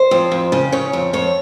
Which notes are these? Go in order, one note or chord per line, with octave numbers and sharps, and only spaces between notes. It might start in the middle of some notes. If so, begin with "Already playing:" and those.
Already playing: C5
F2
F2
C#3
C#3 C#5
F2
F2 C#5